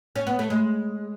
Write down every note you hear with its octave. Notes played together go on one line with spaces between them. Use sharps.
C#4
B3
A3
G#3